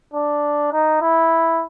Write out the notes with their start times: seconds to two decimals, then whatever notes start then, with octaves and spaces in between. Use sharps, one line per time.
0.13 D4
0.73 D#4
1.01 E4